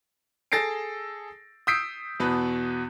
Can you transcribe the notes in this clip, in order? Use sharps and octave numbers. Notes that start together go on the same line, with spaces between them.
G#4 A4 A6 A#6 C7 D7
D#6 E6 G6 B6 C7 D7
E2 B2 B3 B5